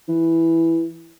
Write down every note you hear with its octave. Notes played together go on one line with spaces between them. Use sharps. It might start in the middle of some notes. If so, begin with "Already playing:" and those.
E3